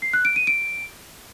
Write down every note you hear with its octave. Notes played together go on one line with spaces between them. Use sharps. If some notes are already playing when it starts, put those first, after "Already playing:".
C7
F#6
D7
D#7
D7